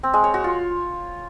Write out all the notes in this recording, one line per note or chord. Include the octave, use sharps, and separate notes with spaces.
C4
G#3
C#5
F#4
F4